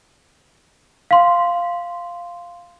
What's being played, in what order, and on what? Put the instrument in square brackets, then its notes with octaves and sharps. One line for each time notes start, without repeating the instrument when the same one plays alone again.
[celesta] F5 C6